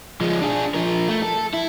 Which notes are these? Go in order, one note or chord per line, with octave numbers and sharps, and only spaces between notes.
F3 G#3
D4 G#4
F3 A#4
A3
A4
E4